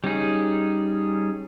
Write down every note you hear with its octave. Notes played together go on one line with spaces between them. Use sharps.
G3 C#4 D#4 G#4